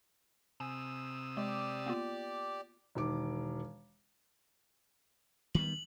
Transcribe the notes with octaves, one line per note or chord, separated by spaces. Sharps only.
C3 G#5 D#6 E6
G#3 G4 D5
A#3 B3 F4
E1 D#3 D6
D#3 G3 B3 F#7